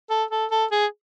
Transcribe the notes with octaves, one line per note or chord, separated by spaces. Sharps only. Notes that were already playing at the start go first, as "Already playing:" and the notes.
A4
A4
A4
G#4